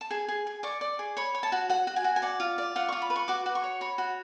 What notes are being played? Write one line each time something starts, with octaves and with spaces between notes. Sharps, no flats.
A5
G#4 G#5
G#4
G#4
D5 C#6
D5
G#4
C#5 B5
C#5
A5
F#4
F#4 F#5
F#4
G#5
F#4
G#5
D5 F#5
F4
D5
F4 F#5
F4 C#6
B5
B4
C#6
F#4 D6
F#4
C#6
C#5
C#5 B5
F#4